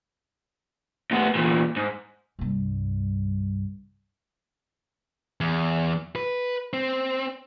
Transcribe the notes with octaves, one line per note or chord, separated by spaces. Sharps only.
D2 B3
E2 A#2
G#2
C2 G2
E2
B4
C4